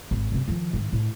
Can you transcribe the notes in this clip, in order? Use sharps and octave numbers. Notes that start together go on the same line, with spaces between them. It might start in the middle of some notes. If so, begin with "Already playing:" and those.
G#1 G#2
F#2 C3
D#3 F3
G#2 D#3
A2